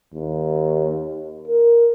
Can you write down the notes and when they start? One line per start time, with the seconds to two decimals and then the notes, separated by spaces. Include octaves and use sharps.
0.14 D#2
1.48 A#4